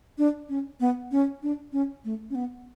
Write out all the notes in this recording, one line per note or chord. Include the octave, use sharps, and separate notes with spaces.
D4
C#4
B3
C#4
D4
C#4
A3
C#4
B3